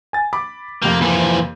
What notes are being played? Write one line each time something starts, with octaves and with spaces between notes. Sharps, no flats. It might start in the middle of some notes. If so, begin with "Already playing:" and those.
G#5 A6
B5 D6
F2 C3 A#3 G6
E3 F3 A#3